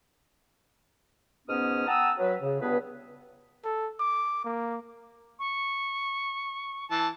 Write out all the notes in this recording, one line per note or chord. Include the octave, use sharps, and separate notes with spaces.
G#2 B2 B3 C#4 D#6 F6
F#5 G5 A5 A#5 D#6 E6
F#3 B4
C#3
C#2 G2 B3 G#4 B4
A4
D6
A#3
C#6
E3 A5